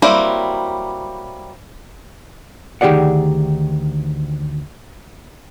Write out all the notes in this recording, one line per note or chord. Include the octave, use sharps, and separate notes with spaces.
F#3 G3 A#3 C4 E4
D2 D#3 G4 G#4 D5 F#5